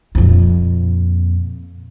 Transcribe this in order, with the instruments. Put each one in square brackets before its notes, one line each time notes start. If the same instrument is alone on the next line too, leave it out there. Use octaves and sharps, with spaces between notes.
[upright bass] F2 A#2